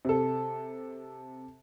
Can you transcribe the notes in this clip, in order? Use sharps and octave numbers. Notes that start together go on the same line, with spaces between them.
C3 A4